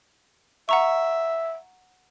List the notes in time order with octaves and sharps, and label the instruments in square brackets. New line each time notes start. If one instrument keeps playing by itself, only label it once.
[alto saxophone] E5 [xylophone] F#5 A#5 C#6